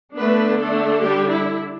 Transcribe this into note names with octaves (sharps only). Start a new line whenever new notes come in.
D3 A3 B3 D4 B4
A3 A4
G3 G4
E4